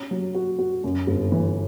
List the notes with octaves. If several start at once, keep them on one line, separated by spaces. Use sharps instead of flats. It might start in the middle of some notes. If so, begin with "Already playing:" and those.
Already playing: C#4
F#3
F#4
F#4
F#2
G1
E3